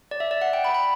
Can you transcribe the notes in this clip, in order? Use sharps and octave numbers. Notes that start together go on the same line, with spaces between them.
D5
E5
D5
F#5
G5
B5
B5